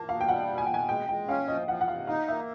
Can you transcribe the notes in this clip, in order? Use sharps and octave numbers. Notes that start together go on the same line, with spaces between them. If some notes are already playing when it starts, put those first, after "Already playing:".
Already playing: A#3 A5
B2 F5
G5
G3 F#5
B2
G#5
B2 G5
G#5
G#3 G5
G#3 G5
C#4 F5
F3 D#5
F3 F#5
F#5
C3 F5
D#4 F5
A#3 E5